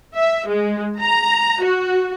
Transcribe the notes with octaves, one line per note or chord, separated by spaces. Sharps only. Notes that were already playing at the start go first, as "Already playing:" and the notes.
E5
G#3
A#5
F#4